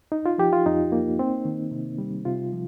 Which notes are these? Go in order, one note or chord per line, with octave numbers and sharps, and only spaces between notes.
D#4
F4
F3 G4
F4
F2 D#4
A#3
C4
D#3
C3
G3
C3 F4
F3